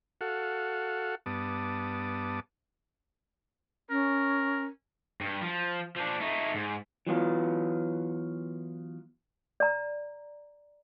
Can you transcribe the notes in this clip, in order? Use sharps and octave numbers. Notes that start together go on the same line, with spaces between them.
F#4 A4 F5 F#5
G2 B3 A5 D6 D#6
C#4 A#4
G2
F3
F3 D4
A3 D#4
G#2
E3 F#3 B3 F4
D5 A#5